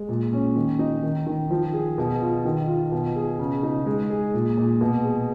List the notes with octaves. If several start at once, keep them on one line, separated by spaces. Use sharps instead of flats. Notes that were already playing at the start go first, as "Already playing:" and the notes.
Already playing: G#3
A#2
C#4
D#3
D#4
D#3
D#3
F3
G#4
B2
F4
D#3
F4
B2
G#4
C#3
D#4
G#3
G#4
A#2
A#2
B2
G#4